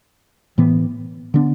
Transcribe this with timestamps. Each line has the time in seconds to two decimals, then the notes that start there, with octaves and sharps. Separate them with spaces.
0.58 A2 E3 B3
1.34 D3 B3 D4